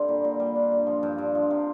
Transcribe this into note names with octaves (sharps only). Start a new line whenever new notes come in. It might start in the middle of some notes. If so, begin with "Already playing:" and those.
Already playing: D3 G3 C4 F4
A#2
A#2
G3
D4
G2
F3
G2
G2
F3
C3